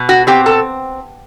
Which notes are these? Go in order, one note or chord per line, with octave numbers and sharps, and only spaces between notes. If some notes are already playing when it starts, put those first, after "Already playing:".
Already playing: B2
F#4
C4 G4
A4